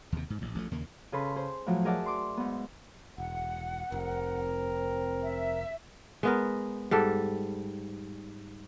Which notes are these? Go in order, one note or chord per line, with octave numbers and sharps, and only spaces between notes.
D#2 C3
G#2
A1
A1 F3 A3
D#2 C#3 A#3
C#3 G#4 A4 B4 C6 C#6
G#4 C5
A2 F3 F#3
G#4 A#4 D5 E5 F#5 A5
C6 D6
G#2 B3
E1 F#5
F1 C4 A#4
E5
G#3 B3 A#4
G#2 G3 A4